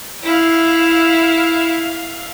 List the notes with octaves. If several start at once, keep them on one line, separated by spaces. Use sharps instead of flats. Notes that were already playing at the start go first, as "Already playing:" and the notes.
E4 E5 F5